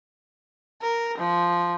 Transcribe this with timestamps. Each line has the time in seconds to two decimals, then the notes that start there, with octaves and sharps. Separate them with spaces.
0.81 A#4
1.18 F3